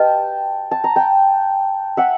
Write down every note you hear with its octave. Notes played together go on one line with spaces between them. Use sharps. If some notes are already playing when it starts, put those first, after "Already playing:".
Already playing: G4 B4 D#5 G5 A5
A5
A#5
G5 A5
E5 F#5